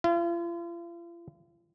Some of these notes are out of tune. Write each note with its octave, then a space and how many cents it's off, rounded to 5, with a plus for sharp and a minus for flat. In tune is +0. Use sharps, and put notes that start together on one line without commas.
F4 -40